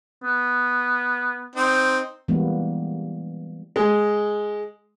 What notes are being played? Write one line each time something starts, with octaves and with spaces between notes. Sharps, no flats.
B3
C4 D#4
E3 G3 G#3 A#3 B3
G#3